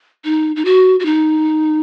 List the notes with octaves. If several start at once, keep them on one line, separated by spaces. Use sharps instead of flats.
D#4
D#4
F#4
F#4
D#4